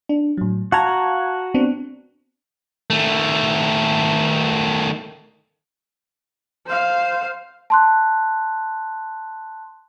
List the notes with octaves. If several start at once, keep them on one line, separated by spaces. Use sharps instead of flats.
D4
A2 F#3
F#4 F5 A5 A#5 G#6
B3 C4 D4
D#3 A3
C5 F5
A5 C6 F#6